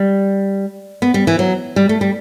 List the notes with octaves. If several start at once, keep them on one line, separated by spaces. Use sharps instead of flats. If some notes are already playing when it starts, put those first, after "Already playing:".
Already playing: G3
B3
G3
E3
F#3
G3
A3
G3